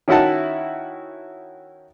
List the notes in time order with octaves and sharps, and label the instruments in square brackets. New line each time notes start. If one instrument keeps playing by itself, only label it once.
[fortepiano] D#3 C#4 E4 F#4 F#5 A5